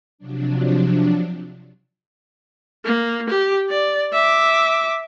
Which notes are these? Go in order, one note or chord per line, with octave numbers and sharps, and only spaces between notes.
C3 F3 F#3 D4
A#3
G4
D5
E5 D6